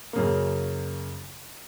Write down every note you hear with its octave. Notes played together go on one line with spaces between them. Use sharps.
F#2 C#3 A#3